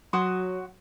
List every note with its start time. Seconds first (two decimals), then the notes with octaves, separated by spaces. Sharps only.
0.13 F#3 F#4 C6 D#6